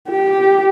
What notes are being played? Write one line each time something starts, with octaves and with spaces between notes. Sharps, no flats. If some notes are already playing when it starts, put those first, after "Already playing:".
G4